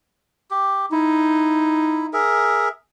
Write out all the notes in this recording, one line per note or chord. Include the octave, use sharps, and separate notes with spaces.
G4
D#4 E4
G#4 A#4 E5